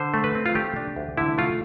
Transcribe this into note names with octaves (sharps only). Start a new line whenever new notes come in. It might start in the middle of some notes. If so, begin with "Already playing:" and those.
Already playing: D3 C5
A3
B4
C4
F4
A3 G4
D4
D2
D3 E4
A3 F4